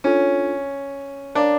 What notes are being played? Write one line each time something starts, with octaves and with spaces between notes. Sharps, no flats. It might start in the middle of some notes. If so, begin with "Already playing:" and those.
C#4 D4 F4 A4 C#5
D4 A#4 C#5 F5 A#5 D6